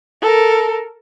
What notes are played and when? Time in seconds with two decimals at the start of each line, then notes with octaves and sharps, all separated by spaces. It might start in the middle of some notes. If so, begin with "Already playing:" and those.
0.22 A4 A#4